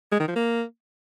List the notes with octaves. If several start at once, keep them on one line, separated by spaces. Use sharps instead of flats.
G#3
D#3
F3
A#3